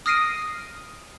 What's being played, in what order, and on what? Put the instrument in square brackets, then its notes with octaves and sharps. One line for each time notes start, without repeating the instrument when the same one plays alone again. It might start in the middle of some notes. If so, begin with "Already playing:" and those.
[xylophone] D#6 F6 A#6 C7 D7 D#7